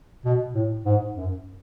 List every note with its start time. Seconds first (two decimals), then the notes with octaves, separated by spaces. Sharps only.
0.25 B2
0.55 A2
0.85 G#2
1.17 F#2